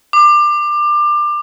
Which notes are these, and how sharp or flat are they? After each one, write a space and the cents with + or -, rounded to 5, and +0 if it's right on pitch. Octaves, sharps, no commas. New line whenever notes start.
D6 +25